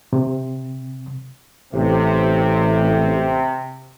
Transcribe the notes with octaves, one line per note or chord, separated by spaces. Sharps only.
C3
A1 C3